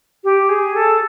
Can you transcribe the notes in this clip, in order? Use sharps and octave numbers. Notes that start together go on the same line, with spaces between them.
G4
G#4
A4